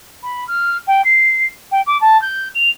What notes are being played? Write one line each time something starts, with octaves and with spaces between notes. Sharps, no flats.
B5
F6
G5
C7
G5
D6
A5
G6
F7